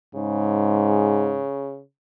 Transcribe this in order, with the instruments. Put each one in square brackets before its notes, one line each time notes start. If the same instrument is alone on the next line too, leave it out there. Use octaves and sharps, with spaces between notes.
[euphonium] G#2 [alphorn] C#3